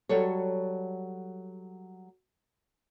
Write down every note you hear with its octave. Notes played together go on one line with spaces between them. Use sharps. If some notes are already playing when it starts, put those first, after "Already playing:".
F#3 G3 A4 C#5